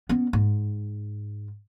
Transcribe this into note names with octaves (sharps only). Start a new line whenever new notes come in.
B3 C#4
G#2